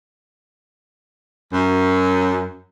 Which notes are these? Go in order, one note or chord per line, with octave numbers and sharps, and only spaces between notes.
F#2